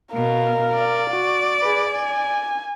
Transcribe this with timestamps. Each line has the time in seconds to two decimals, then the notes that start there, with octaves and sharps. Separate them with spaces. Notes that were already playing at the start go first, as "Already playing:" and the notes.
0.14 B2 A#4 F5
0.74 D5
1.10 F#4
1.62 G#4 B4
1.91 G#5